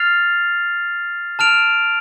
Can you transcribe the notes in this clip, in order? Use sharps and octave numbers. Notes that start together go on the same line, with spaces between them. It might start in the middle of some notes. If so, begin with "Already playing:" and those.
Already playing: F6 A6 C7 F7
A5 F6 D7 F7